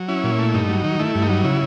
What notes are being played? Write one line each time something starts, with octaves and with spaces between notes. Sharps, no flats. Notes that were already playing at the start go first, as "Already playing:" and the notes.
Already playing: F#3
C#4 E4
A#2
A3
G2 D#4
F#3
D#3
A3 E4
G2
D#4
F#3
C#3 E4